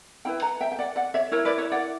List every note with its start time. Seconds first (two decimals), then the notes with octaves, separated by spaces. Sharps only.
0.25 C#4 E4 B4 G5 B5
0.42 F#5 A#5
0.61 E5 G5
0.72 G5
0.79 D5 F#5
0.96 D5 F#5
1.14 C#5 E5
1.32 E4 A#4 C#5
1.45 B4 D5
1.58 C#5 E5
1.72 D5 F#5